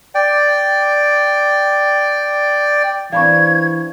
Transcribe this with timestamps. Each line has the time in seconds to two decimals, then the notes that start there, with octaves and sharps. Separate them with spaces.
0.15 D5 G5
3.12 E3 C4 D4 F5 B5 C#6 G#6